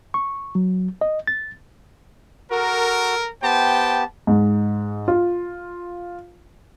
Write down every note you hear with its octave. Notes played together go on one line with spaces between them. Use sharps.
C#6
F#3
D#5
A6
F#4 A4 A#4
B3 G4 C5 G5 A5
G#2
F4